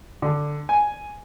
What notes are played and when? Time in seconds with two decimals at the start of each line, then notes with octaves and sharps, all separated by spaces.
0.22 D3
0.69 G#5